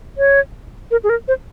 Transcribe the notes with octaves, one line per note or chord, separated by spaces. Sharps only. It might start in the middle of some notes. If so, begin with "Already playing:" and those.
C#5
A#4
G#4
A#4
C5